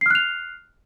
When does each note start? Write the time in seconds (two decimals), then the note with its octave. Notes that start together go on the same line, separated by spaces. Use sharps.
0.01 C7
0.06 F6
0.10 F#6
0.15 F7